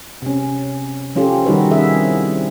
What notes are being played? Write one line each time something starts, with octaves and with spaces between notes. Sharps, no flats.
C3 C#4
F3 C#4 F4 G4 A4
D#3 G3 D#4 F#4 B4
C#4 F#4 G#4 E5
C4 E4